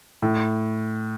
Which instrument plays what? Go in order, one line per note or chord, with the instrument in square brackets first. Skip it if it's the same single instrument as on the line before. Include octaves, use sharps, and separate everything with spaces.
[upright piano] A2